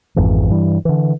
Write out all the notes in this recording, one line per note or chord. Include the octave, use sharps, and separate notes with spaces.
G#1 F2 G#2 E3
G2 E3 G3
D3 E3